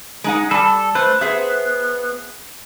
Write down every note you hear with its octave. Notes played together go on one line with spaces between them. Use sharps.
G#3 D#4 F#5
G3 A4 A5
A3 B4 C5
B3 G#4 C5 E5